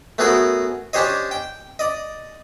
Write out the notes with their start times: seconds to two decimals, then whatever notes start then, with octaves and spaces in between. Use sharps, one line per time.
0.18 A3 B3 C#4 F#4 G#4 A#4
0.93 C#4 D4 G4 C5 C#5 D#5
1.31 G5
1.79 D5 D#5